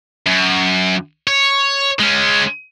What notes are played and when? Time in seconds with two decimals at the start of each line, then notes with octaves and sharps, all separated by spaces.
0.27 F#2
1.27 C#5
2.00 G#3 C#4